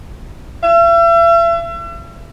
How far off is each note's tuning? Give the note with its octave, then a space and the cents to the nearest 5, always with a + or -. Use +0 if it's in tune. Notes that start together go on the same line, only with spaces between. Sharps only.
E5 +40